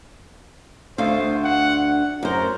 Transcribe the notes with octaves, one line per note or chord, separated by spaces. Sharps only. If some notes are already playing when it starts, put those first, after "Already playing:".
D2 D3 C5 F5
F#5
F#5
F#2 A#4 C5